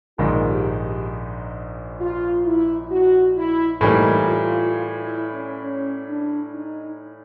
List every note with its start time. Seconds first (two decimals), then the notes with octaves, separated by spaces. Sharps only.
0.18 A#1 G#2 D#3 F4
0.49 G4
2.00 F4
2.45 E4
2.90 F#4
3.36 E4
3.81 A2 E3 G3 A#3 D#4
4.26 F4
4.72 F4
5.02 E4
5.33 C#4
5.63 C#4
6.08 D4
6.54 D#4